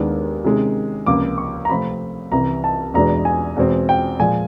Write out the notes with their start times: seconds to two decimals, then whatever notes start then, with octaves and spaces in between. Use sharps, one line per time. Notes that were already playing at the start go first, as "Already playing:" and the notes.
Already playing: D#2 D#3 G#3 B3 D4
0.44 C3 D#3 G#3 C#4
1.06 C#2 C3 F3 A#3 D6
1.38 C#6
1.65 A#5
1.69 C3 F3 A3 C4 B5
2.31 C2 C3 E3 A#5
2.64 A5
2.94 E2 B2 G#3 B3 D4 A#5
3.25 G#5
3.56 E2 B2 G#3 C4
3.89 G5
4.19 A#2 F3 G#3 G#5